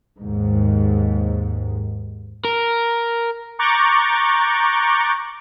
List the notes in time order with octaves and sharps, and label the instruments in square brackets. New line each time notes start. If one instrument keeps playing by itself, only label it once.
[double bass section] D#2 G#2
[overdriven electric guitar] A#4
[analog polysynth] A#5 C#6 D6 F#6 G6 A6